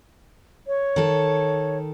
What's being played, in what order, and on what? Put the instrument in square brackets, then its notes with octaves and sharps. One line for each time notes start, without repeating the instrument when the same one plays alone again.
[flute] C#5
[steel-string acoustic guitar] D#3 A4